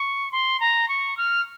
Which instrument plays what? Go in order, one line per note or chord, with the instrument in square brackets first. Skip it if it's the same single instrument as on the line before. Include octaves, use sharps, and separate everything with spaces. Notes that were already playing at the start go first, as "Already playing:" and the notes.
Already playing: [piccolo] C#6
C6
A#5
C#6
F6